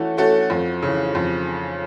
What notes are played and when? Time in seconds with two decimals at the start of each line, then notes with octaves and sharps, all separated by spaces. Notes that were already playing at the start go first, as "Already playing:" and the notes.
Already playing: E3 A3 C#4 F#4 A4
0.17 A3 C#4 F#4 A4
0.50 F2
0.82 C#3 E3
1.15 F2